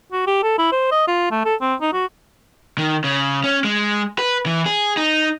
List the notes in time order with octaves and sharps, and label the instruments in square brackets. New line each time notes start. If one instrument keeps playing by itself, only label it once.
[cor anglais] F#4
G4
A4
E4
C5
D#5
F4
A3
A4
C4
D#4
F#4
[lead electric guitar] D#3
C#3
C#4
G#3
B4
E3
G#4
D#4